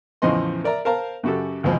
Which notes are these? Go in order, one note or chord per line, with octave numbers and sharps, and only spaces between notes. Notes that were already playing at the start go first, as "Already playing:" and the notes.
E2 A2 C#3 F3 D#5 C6
A#4 D5 E5 A#5
A#4 C5 F5 A5 A#5
F#2 C#3 F#4 G4 A4
A1 D#2 B2 F3 G#3 C4